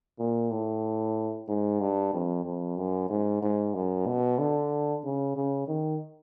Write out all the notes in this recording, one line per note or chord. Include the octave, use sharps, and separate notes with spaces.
A#2
A2
G#2
G2
F2
F2
F#2
G#2
G#2
F#2
B2
D3
C#3
C#3
D#3